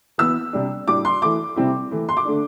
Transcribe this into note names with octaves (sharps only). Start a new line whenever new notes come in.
E3 B3 E4 E6
C3 G3 D4
A2 G3 D4 D6
C6
E3 A3 E4 D6
C3 G3 C4 E4
E3 A3 E4
C6
D6
D3 A3 D4